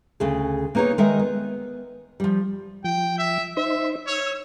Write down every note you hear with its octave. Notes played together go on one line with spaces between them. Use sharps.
D2 C#3 G#4
A#3 B3 D#4 G#4 C#5
D#3 G#3 D#4 A#4 B4 E5
B3
F3 G3
F3 G5
E5
D#4 C5 E5
C#5 E6